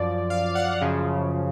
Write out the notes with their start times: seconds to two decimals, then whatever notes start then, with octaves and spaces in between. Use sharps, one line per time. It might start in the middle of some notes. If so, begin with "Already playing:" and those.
Already playing: F#2 F3 D5
0.30 F5
0.55 F#5
0.81 F#2 C#3 F3